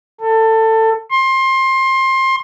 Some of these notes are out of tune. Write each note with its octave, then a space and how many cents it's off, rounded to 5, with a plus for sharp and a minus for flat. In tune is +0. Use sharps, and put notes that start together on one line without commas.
A4 +20
C6 +25